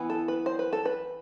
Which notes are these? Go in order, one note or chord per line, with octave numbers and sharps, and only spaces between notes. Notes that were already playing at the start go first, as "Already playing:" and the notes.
Already playing: E3 B3 E4
A4
B4
C5
B4
A4
B4